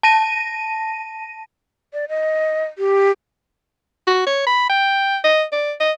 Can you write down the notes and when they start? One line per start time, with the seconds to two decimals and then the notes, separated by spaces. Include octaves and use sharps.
0.03 A5 A#6 D#7
1.93 D5
2.09 D#5
2.78 G4
4.07 F#4
4.27 C#5
4.47 B5
4.70 G5
5.24 D#5
5.52 D5
5.80 D#5